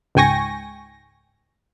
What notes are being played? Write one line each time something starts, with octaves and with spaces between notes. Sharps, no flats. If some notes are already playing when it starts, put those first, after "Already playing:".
C#2 G#2 G5 G#5 C#6 A#6